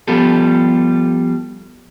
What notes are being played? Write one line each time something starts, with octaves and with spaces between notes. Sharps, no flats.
F3 G3 B3 F4 G4 A4